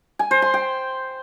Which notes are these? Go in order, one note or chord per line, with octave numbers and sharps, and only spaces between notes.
G#5
C5
C6
G5